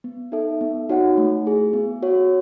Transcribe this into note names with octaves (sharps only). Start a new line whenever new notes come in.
B3
D#4 A4 E5
B3
D#4 F#4 C#5 F#5
A3
E4 G#4
B3
F#4 C#5